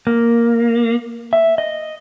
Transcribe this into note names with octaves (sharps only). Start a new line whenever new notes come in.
A#3
E5
D#5